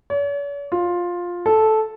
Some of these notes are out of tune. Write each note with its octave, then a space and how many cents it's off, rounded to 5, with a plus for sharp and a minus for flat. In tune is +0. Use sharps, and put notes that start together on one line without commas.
C#5 +45
F4 +10
A4 -10